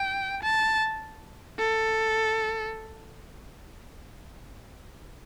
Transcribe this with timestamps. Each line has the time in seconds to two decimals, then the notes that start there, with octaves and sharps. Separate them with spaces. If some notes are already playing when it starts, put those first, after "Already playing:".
Already playing: G5
0.43 A5
1.59 A4